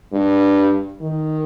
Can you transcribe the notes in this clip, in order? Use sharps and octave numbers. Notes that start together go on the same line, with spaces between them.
G2
D#3